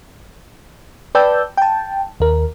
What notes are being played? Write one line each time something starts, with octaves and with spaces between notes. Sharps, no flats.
B4 D5 G5 A5 E6 G6
G5 A5
D#2 A#4